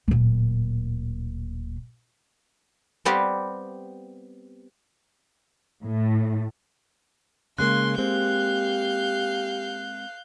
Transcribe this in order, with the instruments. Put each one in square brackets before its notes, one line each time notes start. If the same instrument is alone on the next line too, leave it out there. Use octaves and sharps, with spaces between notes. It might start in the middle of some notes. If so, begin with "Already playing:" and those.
[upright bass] D1 A#2
[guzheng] G3 B3 C4 G4 B4 F5
[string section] A2
[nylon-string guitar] C#3 G#3 A#3 [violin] C6 [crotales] F#6
[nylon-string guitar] G#3 A#3 C4 [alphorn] G4 [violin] F5 G6